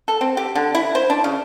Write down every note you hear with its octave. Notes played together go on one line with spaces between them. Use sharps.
A4
C4
G4
D3
E4
C5
D4
C#3